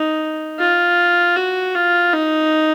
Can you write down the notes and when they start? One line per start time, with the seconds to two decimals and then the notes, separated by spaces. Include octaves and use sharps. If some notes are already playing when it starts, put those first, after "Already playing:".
Already playing: D#4
0.59 F4
1.36 F#4
1.75 F4
2.13 D#4